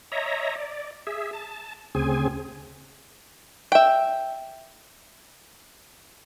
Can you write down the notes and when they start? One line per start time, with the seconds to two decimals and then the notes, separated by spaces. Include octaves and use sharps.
0.12 C#5 D#5 E5 A#5
0.56 D5
1.07 G#4 E5
1.33 A5
1.95 D2 C#3 C4 G#4 G#5
3.72 E5 G5